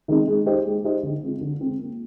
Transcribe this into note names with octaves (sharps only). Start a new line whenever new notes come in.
D#3 G#3 C4 D#4
G#3
D#4 G4 C5 D#5
G#3
D#4 G4 C5 D#5
D3
G#3 C4 F4
D3
G#3 C4 F4
A#3